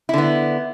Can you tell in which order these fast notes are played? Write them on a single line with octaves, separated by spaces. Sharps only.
E4 D3 B3